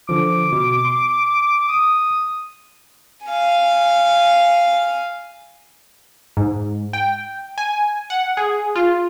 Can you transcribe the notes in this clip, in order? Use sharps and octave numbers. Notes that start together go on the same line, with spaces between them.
D3 F3 D6
B2
C6
D#6
F5 G#5
G#2
G5
G#5
F#5
G#4
F4